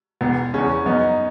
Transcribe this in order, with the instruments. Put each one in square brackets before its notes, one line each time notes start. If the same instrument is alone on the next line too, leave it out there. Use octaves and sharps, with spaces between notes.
[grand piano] E1 [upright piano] B3
[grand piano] E2 C#3 [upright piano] C#4
[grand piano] F#2 [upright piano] B3 D#4